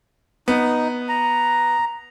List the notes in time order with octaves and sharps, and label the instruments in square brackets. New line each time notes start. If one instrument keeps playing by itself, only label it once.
[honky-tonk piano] B3 [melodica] D#4
[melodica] A#5